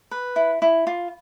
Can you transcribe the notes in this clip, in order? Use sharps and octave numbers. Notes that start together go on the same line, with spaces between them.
B4
E4
E4
F4